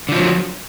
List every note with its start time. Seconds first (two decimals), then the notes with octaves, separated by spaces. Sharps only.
0.09 D3
0.12 F3
0.15 F#3